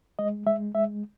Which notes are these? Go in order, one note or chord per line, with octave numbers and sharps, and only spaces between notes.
G#3 D#5
G#3 E5
G#3 E5